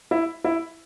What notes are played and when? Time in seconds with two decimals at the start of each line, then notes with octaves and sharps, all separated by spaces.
0.11 E4
0.44 E4